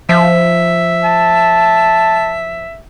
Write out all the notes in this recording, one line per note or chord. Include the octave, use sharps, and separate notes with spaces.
F3 E5
A5